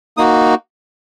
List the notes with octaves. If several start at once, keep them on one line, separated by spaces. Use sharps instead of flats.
A#3 D#4 F#4 D#6